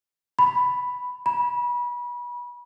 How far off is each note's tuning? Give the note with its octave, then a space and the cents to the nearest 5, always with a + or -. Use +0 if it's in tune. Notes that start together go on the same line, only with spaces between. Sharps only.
B5 +0
B5 -30